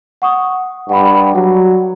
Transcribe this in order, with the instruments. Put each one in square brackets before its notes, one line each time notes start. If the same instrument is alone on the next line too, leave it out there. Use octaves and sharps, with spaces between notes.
[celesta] F#5 C#6 D#6
[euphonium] G2 [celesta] F#5 B5
[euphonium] F#3 [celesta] F#5